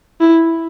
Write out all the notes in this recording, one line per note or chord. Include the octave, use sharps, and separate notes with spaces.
E4